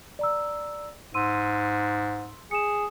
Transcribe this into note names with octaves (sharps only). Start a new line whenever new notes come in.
D5 A#5 E6
G#2 C6 E6 D#7
G#4 C#7 E7